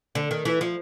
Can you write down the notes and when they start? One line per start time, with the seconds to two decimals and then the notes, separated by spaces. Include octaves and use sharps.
0.15 D3
0.31 D#3
0.45 E3
0.61 F3